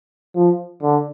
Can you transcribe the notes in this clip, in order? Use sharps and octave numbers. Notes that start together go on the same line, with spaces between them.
F3
D3